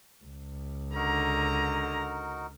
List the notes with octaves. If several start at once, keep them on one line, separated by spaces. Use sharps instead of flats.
C#2
D3 D#4 F#4 A#4 A#5